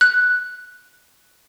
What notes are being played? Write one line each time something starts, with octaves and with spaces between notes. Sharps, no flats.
F#6